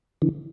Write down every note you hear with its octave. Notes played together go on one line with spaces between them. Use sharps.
D3 E3